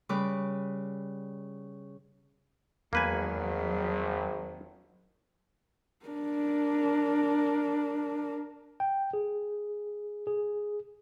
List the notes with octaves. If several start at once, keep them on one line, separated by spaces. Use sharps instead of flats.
C#3 G3 B4 D6
G#1 E2 F#3 A#3 B4 G#5
D4 A#4
G5
G#4
G#4